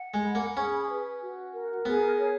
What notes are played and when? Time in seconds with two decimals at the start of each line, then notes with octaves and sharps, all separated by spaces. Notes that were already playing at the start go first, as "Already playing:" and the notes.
Already playing: F#5
0.14 G#3
0.25 B5
0.35 A#3
0.56 C#4 G#4
0.89 B4
1.22 F#4
1.53 A#4
1.85 B3 G#4
2.18 C#5